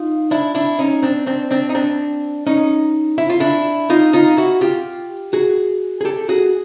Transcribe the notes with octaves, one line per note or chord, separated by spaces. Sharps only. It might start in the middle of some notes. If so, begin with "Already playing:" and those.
Already playing: D#4 F4
D4 E4
D4 E4
C#4 D#4
C4 D4
C4 D4
C4 D4
D#4
C4 D4
C#4 D#4
E4
F4
D4 E4
D#4 F4
D#4 F4
E4 F#4
F4 G4
F#4 G#4
G#4
G4 A4
F#4 G#4